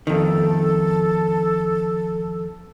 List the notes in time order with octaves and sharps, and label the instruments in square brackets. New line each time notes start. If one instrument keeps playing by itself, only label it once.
[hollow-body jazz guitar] F2 D#3 [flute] A4